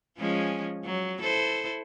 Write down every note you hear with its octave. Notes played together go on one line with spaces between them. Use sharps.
F3 G#3 C#4
F#3
E4 A4 C5